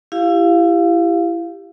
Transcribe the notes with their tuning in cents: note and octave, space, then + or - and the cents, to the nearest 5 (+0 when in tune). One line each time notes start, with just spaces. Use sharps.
E4 +25 G4 +0 F5 +0